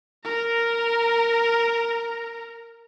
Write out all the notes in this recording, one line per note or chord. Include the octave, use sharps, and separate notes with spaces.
A#4 A#5